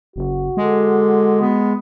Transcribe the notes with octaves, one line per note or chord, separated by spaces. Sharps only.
F#1 F#4
D3 G#3
B3